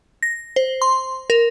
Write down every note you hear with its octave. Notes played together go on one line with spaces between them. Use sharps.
A#6
C5
C6
A#4